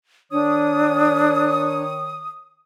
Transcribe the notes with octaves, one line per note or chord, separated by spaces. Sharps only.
D#3 D4 C#5 D#6